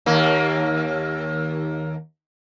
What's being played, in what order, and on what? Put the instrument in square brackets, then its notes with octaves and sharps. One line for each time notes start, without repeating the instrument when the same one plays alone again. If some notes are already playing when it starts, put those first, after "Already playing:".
[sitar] D#2 A#3